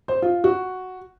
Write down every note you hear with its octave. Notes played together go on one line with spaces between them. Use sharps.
C5
F4
F#4